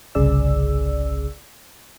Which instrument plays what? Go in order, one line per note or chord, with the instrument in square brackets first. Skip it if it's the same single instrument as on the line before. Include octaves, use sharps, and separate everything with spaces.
[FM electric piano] G1 C2 C#3 G#4 D5 E6